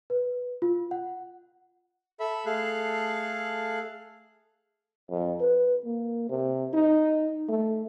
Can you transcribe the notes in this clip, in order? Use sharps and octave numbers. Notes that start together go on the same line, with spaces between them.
B4
F4
F#5
A4 E5 B5
A3 G#4 A4 F5 F#6
F2
B4
A#3
C3
D#4
A3